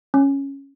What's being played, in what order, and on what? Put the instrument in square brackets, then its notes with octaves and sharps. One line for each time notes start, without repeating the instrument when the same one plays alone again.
[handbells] C#4